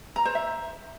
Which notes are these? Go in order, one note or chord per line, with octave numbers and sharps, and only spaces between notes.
A#5
C5
E5